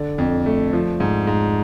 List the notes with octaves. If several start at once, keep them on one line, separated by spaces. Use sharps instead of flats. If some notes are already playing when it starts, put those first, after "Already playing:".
Already playing: D3 D5
F2
A3
F3
G#2
G#2